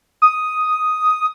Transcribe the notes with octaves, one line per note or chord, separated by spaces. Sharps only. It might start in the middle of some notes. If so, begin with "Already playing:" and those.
D#6